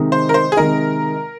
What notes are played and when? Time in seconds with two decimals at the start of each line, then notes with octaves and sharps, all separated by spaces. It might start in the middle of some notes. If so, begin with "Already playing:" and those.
Already playing: C3 D#3 G#3 D#4
0.12 C5
0.29 A#4
0.34 C5
0.52 G#4
0.57 C3 D#3 G#3 D#4 A#4